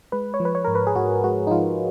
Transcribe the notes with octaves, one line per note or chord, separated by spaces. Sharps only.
G#3 B4
C#5
F3
B4
C#5
G#2 A#4
B4
G#4
G#2 F#4
G#3 F#4
D#4
F3 F4